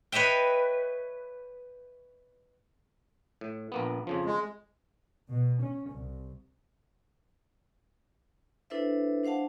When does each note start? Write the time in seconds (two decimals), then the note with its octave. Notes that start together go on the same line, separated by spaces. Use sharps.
0.12 B4 C#5 D#5 E5 G5
3.41 A2
3.72 A#1 A#3 B3
4.07 F2 C#3 F3
4.25 G#3
5.26 B2
5.59 C#4
5.90 C2
8.70 D4 E4 A4 B4 C5 E5
9.23 D4 C5 F5 F#5 A5